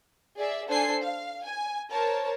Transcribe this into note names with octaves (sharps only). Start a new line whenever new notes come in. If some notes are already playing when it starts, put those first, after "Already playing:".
G#4 D5 E5
D4 A4 C5 G#5 C7
F5
G#5
A#4 C5 C#5 A5